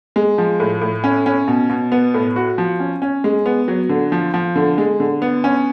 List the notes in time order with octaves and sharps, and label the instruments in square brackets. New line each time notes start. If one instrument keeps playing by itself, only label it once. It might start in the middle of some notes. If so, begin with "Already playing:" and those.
[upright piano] G#3
F3
A2
A2
C#4
C#4
B2
B2
B3
A2
F#4
F3
C#4
C#4
G#3
B3
F#3
D3
F3
F3
D3
G#3
D3
B3
C#4